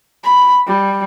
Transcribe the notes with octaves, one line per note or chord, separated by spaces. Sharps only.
B5
G3